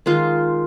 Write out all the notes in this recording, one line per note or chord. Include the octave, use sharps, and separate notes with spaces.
D#3 G#3 F4